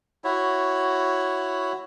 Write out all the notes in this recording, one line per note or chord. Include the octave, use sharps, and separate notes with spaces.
E4 F#4 C#5